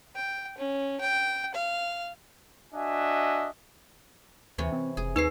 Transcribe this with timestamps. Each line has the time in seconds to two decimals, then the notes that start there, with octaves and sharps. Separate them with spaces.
0.15 G5
0.58 C#4
1.00 G5
1.54 F5
2.73 D4 F#4 D#5 E5 G#5
4.58 D#2 C3 E3 C#5
4.72 C4
4.97 F1 G#4
5.16 D#2 D#4 A#4 B4 C#5 C7